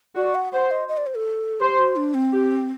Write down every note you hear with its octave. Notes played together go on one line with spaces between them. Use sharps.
F#4 D5
F#5
C5 F#5
D#5
D#5
D5
C5
A4
G4 C5
F#4
D4
C4
G4